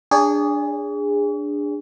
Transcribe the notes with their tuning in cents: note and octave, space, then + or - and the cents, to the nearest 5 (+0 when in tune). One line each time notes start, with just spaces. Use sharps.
D4 +0 G#4 -20 C#5 +45